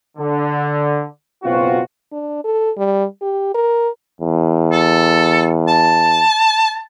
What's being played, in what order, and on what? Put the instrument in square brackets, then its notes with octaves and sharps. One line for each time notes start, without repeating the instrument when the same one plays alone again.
[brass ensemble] D3
F#1 B2 C4 F4 F#4
[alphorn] D4
A4
G3
G4
A#4
[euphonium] E2
[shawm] A4
A5